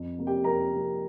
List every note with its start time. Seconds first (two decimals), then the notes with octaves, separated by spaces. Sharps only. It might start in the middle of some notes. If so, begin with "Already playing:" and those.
Already playing: F2
0.18 C3 A#3
0.27 G4 G5
0.44 F2 A#4 A#5
0.72 C3 A#3